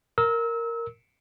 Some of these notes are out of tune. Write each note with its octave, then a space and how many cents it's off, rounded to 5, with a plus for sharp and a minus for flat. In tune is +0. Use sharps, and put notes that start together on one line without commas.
A#4 -5 E6 -30